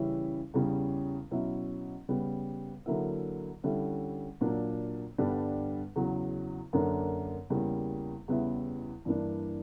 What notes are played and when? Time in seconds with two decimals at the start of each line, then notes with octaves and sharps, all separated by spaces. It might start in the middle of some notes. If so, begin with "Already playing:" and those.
Already playing: C#3 E3 G3 C#4 E4
0.54 E2 C#3 G3 C#4
1.31 B2 F#3 C#4 E4
2.09 C#3 G3 B3
2.86 D3 F#3 A#3 E4
3.64 D3 G3 C#4 E4
4.41 A#2 F#3 A#3 D4
5.18 G2 D3 G3 B3 D4
5.96 E2 C#3 F#3
6.73 F#2 D3 A#3 D4
7.50 E2 C#3 G3 A#3
8.28 E2 C#3 G3 B3 E4
9.05 G2 E3 A#3 D4